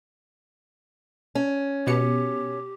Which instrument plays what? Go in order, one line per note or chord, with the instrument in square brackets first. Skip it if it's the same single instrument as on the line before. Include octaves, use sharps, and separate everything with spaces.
[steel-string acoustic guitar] C#4
[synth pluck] B2 C#7 [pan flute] G4